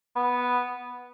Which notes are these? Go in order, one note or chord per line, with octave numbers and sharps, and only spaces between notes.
B3